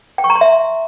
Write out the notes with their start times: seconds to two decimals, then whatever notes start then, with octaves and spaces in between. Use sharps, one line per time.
0.18 G5
0.24 C#6
0.30 A#5
0.35 C6
0.41 E5